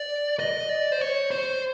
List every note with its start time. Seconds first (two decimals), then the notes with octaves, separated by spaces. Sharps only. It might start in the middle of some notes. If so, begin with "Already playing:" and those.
Already playing: D5
0.40 D#5
0.69 D5
0.92 C5
1.01 C#5
1.31 C5